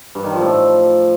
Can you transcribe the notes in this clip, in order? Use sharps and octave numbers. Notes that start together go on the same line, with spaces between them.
G2
D#3
F3
A2